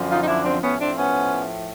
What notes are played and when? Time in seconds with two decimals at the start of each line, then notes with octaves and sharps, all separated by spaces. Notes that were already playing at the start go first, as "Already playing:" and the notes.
Already playing: F#2 D3 F3
0.08 D#4 F4
0.21 D#4
0.26 D4 E4
0.43 C4 D4
0.61 A2 F3 B3 C#4
0.79 C4 D4
0.96 B3 C#4